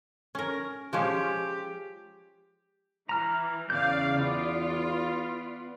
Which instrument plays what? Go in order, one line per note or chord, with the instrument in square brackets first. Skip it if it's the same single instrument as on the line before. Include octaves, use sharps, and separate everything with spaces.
[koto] C#4 A#4
[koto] F3 G#3 C#4 [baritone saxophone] G4
[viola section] E3 [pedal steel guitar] A#5 F6
[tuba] E2 [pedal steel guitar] C#3 G6 [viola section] D5 F5
[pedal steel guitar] B3 D5 [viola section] F4